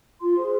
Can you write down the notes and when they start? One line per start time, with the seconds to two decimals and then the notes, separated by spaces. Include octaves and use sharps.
0.21 F4 C6
0.37 G#4 C5